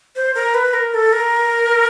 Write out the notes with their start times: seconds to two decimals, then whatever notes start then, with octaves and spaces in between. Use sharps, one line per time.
0.16 C5
0.35 A#4
0.54 B4
0.73 A#4
0.94 A4
1.12 A#4